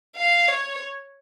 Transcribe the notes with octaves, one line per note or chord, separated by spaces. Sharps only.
F5
C#5